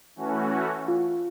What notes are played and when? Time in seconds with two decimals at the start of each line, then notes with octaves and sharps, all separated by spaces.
0.16 E3 A3 C#4 F#4
0.88 F4